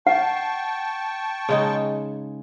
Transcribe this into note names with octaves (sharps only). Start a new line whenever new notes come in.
F#5 G5 A5 C#6
C#3 G#3 D#4